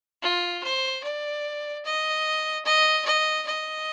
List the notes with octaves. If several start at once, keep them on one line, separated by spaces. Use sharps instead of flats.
F4
C5
D5
D#5
D#5
D#5
D#5